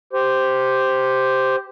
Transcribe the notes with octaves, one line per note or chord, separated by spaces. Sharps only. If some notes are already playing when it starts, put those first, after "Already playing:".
G4 C5